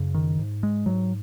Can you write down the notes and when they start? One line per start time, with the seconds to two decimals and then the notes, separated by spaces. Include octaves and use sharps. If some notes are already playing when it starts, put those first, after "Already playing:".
Already playing: F#2 C#3
0.14 D#3
0.39 G#2
0.63 G#3
0.86 G#2 F#3